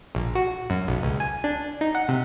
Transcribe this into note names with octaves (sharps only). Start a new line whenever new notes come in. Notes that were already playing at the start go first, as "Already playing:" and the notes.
A#1
F#4
F#2
B1
C#2
G#5
D4
D#4
F#5
C3